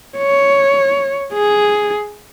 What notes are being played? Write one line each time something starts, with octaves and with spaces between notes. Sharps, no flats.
C#5
G#4